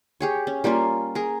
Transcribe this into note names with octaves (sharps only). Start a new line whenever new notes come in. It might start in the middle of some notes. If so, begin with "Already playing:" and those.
G4 G#4 C#5
C#4
G3 A#3 C#4 F4
G#4 A#4